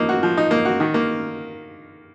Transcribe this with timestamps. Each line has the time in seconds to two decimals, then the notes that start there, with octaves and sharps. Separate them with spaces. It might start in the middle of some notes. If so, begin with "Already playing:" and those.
Already playing: F3 A#3 D#4
0.09 F#4
0.23 F3
0.37 D#4
0.51 A#3
0.65 F#4
0.80 D#3
0.94 A#3